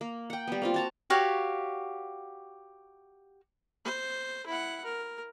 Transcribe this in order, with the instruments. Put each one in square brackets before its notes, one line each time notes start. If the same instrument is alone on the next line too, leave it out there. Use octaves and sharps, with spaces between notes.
[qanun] A#3
F#5 G5
G3 B3
A#3 C4 F4
F#4 A5 A#5
[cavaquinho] F#4 G4 C#5 F5
[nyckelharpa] C5
E4 F#5
A#4